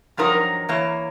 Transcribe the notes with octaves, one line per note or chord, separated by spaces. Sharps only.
G2 F3 F#3 D#4 A#4
E3 A#3 C#5